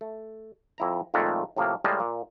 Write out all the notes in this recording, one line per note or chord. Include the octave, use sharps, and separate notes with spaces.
A3
F2 E4 A#5
F2 A#2 D#3 G#3 A3
A2 C3 F3 A#3
A2 G3 G#3 A#3 D#5 A5
A#2